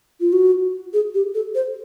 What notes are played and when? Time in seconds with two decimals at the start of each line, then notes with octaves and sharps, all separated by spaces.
0.20 F4
0.33 F#4
0.93 G#4
1.14 G4
1.35 A4
1.55 C5